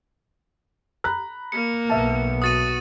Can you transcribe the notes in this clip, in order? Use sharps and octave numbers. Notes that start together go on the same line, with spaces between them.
A#5 B5 F#6
A#3 C#7
B1 B3 E5 A5
F#4 D#6 A6 D#7